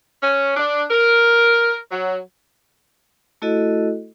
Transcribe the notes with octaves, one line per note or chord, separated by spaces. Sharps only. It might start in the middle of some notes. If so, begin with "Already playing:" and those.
C#4
D4
A#4
F#3
A3 E4 F#4 A4 D#5